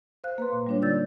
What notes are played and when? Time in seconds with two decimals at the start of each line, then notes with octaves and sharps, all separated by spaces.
0.24 C5 F5 F#6
0.38 A#3 B4 C6
0.53 A#2
0.67 G3 G#3 A#3 D4 F4 C#5
0.82 D3 D#4 D5 E6 G6 A6